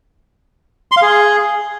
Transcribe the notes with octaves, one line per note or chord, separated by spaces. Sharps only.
C6
F5
G#4